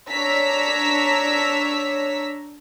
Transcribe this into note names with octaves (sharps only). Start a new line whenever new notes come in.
D4 C#5 A#5 E6 B6